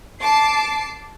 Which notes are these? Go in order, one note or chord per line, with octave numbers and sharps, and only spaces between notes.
A5 D6 C7